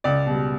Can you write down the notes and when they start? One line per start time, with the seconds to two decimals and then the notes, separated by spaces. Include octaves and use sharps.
0.04 C#2 D5
0.26 B2 G3